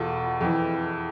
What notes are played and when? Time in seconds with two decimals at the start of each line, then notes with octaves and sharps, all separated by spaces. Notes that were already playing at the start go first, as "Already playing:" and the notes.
Already playing: E2 B2 F4 A4
0.41 F2 E3